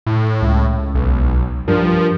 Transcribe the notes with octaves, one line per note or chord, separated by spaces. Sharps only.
A2
C#2
B1
G2 F3 A#4